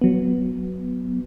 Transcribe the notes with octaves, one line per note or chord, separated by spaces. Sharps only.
F#3 B3